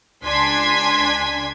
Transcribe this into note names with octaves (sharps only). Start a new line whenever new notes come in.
C#2 D4 G#5 C6 G#6 B6